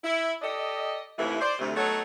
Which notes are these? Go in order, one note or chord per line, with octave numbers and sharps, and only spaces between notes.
E4
G4 A4 D5 D#5
D#2 A2 C3 E3 E4
C5 D5
D2 C3 A3
F#3 A3 B3 D#4 A4 C#5